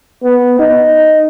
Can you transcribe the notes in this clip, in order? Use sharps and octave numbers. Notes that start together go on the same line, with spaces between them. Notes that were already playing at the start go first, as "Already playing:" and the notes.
B3
D#4